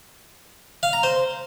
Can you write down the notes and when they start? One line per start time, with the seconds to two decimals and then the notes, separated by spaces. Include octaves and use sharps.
0.83 F5
0.93 A#5
1.03 C5